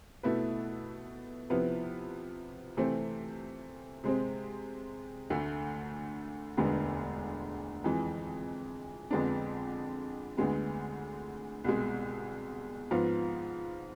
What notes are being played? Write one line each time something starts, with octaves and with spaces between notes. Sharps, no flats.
B2 A3 E4 B4
C3 F3 B3 E4 B4
C3 E3 A3 C4
C3 G#3 C4
D2 D3 A3
E1 D2 D3 G#3 B3
F2 E3 G#3
F2 D3 G#3 B3 D4
D2 D3 G#3 B3
C2 B2 G#3
G#2 F3 B3 F4